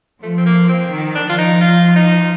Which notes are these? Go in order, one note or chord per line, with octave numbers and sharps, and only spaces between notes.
F3 A3
C4
A#3
C4
D#3
D4
F3 F4
D#4
F4
D#4